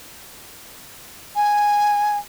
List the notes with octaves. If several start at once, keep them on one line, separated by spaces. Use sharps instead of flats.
G#5